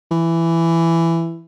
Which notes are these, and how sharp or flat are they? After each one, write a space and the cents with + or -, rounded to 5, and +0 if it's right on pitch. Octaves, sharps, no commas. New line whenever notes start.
E3 +10